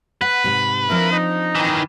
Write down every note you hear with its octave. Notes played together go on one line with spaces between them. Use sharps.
B4 F#5
G#2 C3
F3 A#3 C4 D4 E4 A#4
D#4
D#3 E3